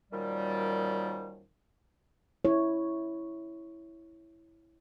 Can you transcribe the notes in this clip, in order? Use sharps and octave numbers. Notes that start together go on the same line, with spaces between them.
F#2 A#2 D#3 F3 G3
E4 C#5